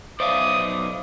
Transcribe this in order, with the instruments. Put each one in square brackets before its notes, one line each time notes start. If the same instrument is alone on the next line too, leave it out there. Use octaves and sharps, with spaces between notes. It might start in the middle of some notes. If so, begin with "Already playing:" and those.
[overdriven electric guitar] B1 D5 [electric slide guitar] C5 E5 F5 [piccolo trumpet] D#6